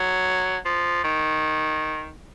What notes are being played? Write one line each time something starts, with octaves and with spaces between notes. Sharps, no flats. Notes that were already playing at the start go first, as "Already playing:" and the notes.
Already playing: F#3
F3
D#3